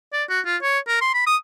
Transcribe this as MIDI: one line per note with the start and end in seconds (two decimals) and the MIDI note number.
0.13 0.24 74
0.29 0.40 66
0.46 0.57 65
0.62 0.79 73
0.88 1.00 70
1.01 1.09 84
1.14 1.24 83
1.27 1.36 87